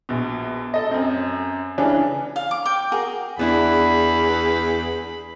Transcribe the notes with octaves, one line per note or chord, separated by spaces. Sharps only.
A#1 B2
A4 D#5
F#2 C4
C#3 E3 C#4 D4
F5
D6
G5 D6
F#4 G#4 A#4
E2 B3 D4 E4 G#4 B5